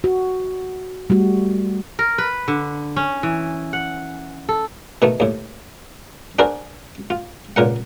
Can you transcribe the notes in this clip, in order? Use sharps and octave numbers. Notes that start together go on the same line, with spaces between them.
F#4
G3 A3 F#4
A#4
B4
D3
C#4
E3
F#5
A4
B2 D#3 A3
D#2 A2
D4 F#4 G#4 A#4 C5 D5
F4
C#2 A#2 A#4 F#5